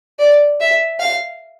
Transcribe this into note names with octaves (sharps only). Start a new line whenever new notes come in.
D5
E5
F5